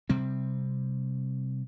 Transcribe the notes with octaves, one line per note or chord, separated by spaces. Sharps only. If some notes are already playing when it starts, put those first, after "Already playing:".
C3 G3 C4